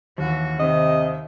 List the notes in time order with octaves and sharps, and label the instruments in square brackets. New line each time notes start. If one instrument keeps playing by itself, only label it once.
[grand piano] D#2 [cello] E3 F#4
[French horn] C3 [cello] D#3 [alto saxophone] D#5